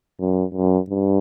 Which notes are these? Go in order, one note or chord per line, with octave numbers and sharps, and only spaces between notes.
F#2
F#2
G2